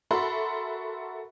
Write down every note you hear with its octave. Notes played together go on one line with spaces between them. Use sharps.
F#4 A4 A#4 E5 B5 C6